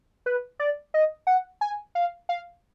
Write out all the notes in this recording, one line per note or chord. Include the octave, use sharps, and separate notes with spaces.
B4
D5
D#5
F#5
G#5
F5
F5